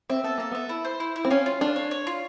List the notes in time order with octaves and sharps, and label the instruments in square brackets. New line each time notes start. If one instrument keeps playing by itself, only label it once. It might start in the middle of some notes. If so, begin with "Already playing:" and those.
[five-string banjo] C4 [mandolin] E5
[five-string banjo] B3 [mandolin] A4
[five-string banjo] A#3 [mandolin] A4
[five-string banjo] B3 [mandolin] E5
[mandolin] E4
C5
E4
E4
[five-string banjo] C4
[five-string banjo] C#4 [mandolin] F4
[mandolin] F4
[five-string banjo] D4 [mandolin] F4
[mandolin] C#5
C#5
F4